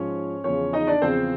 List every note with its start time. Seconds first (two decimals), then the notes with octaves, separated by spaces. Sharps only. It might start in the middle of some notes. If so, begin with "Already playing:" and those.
Already playing: G#2 F3 C#4 C#5
0.44 E2 C#3 F3 C#4 C#5
0.73 D#4 D#5
0.87 D4 D5
1.02 E2 C#3 F3 C4 C5